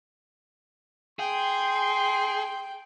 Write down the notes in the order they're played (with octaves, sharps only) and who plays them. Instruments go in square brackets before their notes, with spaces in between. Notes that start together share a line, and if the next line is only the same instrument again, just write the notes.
[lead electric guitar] G#4 [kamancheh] G5 [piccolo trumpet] C6